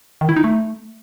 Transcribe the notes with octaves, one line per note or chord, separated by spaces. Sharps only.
D#3
E4
D#4
A3